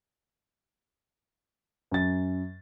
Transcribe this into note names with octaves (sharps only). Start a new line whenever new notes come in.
F#2 A6